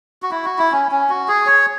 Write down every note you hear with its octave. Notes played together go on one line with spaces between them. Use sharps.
F#4
E4
F#4
E4
C#4
C#4
F#4
G#4
C#5